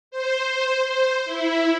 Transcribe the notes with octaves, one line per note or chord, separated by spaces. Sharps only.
C5
C5
E4